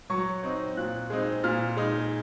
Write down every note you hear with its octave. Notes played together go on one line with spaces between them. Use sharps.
F#3 C#6
C4 D#4
A#2 F#6
G#3 C4 D#4
A#2 F6
G#3 D#4